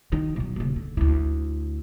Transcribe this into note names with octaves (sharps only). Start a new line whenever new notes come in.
D#3
B2 F#3
D#1 C#3
D3
D2 E4